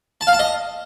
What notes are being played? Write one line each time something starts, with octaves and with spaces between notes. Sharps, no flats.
A5
F5
A5
D#5